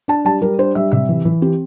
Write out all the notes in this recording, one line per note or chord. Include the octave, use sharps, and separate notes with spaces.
D4 A5
G3 A5
G3 A#4
D4 C5
G3 E5
C3 E5
E3
E3
C4 G4